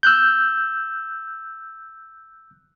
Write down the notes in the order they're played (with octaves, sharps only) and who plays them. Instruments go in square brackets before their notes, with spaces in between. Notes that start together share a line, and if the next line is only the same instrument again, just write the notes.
[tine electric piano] E6 F#6 G6